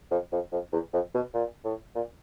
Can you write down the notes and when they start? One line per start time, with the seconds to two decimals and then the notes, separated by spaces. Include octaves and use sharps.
0.11 F2
0.33 F2
0.52 F2
0.73 E2
0.93 F2
1.14 B2
1.34 A#2
1.64 A2
1.95 A#2